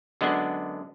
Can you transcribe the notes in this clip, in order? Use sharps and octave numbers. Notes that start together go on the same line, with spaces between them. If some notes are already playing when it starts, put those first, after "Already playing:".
F#2 D3 G#3 B3 D4